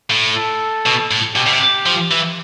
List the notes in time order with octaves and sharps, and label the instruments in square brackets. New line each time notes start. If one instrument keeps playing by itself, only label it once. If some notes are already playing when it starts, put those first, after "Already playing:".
[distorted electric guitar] A2
[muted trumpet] A4
[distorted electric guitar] B2
A2
[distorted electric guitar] B2 [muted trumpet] G4
[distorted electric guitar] B2
C3
F3
E3